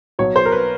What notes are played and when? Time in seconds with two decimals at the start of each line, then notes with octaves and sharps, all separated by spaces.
0.19 B1 B2 F#3 C#5
0.36 C5
0.45 A#4
0.52 B4